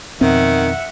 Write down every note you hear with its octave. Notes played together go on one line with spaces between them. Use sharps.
F2 B2 D#3 B3 C4 E5 F#5